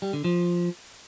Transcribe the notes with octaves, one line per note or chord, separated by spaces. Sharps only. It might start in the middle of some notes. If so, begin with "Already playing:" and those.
G3
D3
F3